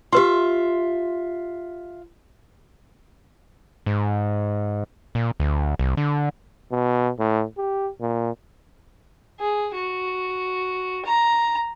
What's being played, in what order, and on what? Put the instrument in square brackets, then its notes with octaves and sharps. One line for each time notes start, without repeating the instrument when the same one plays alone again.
[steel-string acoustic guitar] F4 E5 [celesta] G4 B4 C6
[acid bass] G#2
A#2
D2
C2
D3
[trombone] B2
A2
G4
A#2
[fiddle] G#4
F#4
A#5